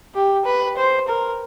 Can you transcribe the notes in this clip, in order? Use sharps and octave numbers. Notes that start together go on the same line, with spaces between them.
G4
B4
C5
A#4